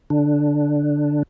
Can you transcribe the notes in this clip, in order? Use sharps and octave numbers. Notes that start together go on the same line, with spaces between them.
D3 D4